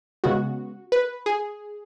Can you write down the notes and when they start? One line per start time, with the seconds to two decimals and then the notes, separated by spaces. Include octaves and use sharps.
0.24 C#3 G#3 B3 F#4
0.92 B4
1.26 G#4